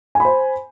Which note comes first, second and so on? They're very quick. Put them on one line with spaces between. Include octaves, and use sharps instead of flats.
G#5 B5 C5